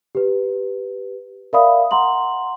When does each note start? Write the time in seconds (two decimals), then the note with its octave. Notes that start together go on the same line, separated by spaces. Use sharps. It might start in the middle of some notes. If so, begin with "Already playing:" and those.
0.15 G4 B4
1.53 A#4 D5 E5 F5 B5 D#6
1.91 F#5 A#5 C6 F#7